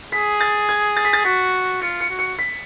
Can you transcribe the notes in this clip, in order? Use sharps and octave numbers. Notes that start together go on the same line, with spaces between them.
G#4 B6
A6
G#6
A6
B6
A6
F#4 B6
F4 C#7
C#7
F#4
C#7
B6